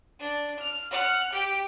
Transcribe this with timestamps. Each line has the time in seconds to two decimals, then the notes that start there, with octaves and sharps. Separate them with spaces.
0.19 D4
0.59 F6
0.91 F#5 F6
1.33 G4 G5